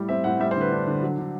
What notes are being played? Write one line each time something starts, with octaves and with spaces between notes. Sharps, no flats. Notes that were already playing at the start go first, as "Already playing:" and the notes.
Already playing: A2 G3
C4 E5
A2 F#5
G3 E5
C5
D3 B4
D4
D3
F#3
D3